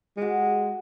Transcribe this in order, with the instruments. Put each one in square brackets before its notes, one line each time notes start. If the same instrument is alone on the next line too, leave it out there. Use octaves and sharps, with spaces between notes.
[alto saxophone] G#3 [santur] F#4 G4